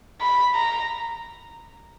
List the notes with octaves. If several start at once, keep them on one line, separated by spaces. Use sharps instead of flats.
B5
A#5